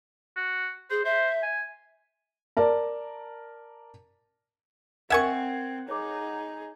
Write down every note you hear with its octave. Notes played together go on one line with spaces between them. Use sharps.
F#4
G#4 C5
C5 E5
G#5
A#4 D5 A5
C4 A#4 D#5 E5 F#5 G#5 C#6 G#6
D#4 G#4 C#5 D6